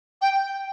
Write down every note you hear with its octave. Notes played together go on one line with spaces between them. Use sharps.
G5